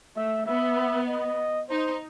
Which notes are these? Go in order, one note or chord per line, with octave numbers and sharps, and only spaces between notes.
A3 E5
B3 E5
D#5
D#4 C5